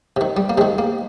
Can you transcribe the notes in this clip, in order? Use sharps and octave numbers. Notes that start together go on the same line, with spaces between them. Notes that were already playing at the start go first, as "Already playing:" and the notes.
C3 D#3
G3
A#3
C3 D#3 G#3
A#3